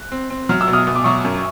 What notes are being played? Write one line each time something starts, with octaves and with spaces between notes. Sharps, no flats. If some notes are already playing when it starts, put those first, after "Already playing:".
Already playing: F#6
C4
C4
F#3 F6
E6
B2
D#6 F6
B2 D#6
D6
F#3 C#6 D#6
F#2